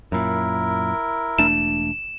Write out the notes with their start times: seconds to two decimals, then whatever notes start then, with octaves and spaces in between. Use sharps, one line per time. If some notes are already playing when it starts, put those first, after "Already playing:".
0.12 F#2 A#2 E4 A#4
1.38 E1 A3 D4 E7